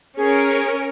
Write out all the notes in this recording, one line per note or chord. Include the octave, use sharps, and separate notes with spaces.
C#4 G#4 A#4